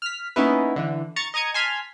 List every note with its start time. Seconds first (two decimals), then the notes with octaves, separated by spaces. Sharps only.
0.02 F6 B6
0.36 A#3 B3 C#4 D#4 E4 B4
0.76 D3 E3
1.16 A#5 C#6 A6 C#7
1.34 D#5 A#5 D#6 G#6 C#7
1.54 G#5 A5 C6 F6 G#6 B6